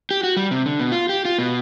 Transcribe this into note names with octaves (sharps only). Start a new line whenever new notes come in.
G4
F#4
G3
C3
D3
B2
F4
G4
F4
B2